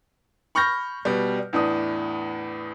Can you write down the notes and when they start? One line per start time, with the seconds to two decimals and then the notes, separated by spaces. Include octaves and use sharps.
0.55 B5 C#6 F6 G6 A#6
1.05 B2 G3
1.53 E2 A2 D4 D#6